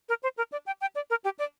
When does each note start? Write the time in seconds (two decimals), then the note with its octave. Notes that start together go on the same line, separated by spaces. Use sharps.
0.09 A#4
0.23 C5
0.38 A#4
0.52 D5
0.66 G5
0.81 G5
0.95 D5
1.10 A#4
1.24 G4
1.39 D5